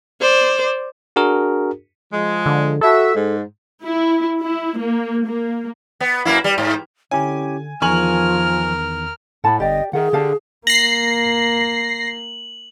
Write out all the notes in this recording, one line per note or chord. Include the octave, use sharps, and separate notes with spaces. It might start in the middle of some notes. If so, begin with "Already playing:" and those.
C5 D5
D4 F#4 G#4 A#4
F3 G#3
D3
F#4 A4 E5
G#2
E4
E4
A#3
A#3
B3
F#2 A#3 E4
G3
G#2
D3 C#4 E4 G4 G#5
E2 D#3 F3 A#4 G#5 C#6 F6 F#7
A2 F#5 A5 B5
G1 G4 D5 D#5 G5
D#3 G#4 A#4 E5 F#5
D3 G4 F5 A5
A#3 A#6 C7 F#7